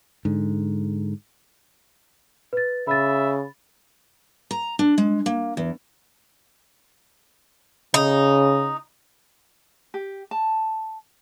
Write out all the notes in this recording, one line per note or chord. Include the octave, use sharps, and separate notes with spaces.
G#2 D3
B4 A6
C#3 E5 B5 A6
A#5
D4
G#3
A#3
E2
C#3 D#4
G4
A5